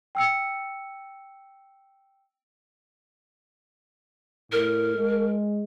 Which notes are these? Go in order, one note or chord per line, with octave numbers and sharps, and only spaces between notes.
G5 E6 C#7
A2 A#4
G#3